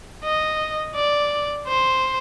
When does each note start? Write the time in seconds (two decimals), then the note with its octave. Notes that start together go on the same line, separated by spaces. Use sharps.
0.25 D#5
0.96 D5
1.68 C5